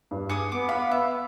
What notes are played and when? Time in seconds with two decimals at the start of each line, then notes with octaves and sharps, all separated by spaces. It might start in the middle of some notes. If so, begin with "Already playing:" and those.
0.11 G2
0.29 G#4 D6 D#6 C#7
0.52 B3 D6
0.69 F5 B5
0.91 E5